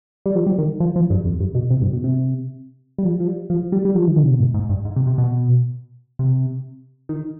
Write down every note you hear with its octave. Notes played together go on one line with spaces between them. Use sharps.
G3
F3
G3
D#3
F3
F3
G2
F2
G2
B2
C3
G2
B2
C3
G3
F3
F3
G3
F3
G3
G3
F3
D#3
D3
C3
B2
G#2
G#2
G2
G#2
C3
C3
B2
C3
D#3